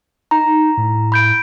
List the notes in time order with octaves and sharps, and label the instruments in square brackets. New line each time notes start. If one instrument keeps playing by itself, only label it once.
[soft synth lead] D#4 [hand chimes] A#5
[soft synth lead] A2
[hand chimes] B5 G6 D7